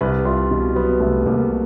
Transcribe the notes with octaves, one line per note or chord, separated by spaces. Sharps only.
C2 B4
C2 F4
B2
F#3 B3
C2 A3
C2 A#3